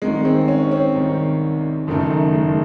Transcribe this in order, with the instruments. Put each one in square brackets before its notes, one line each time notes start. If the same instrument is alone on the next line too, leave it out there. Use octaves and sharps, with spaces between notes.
[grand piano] C2 C3 D#3 [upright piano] G#3
[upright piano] C4
C#4
C4
[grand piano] C2 C3 D#3
[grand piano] F#1 F#2 D#3 [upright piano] A3
[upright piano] A3
G#3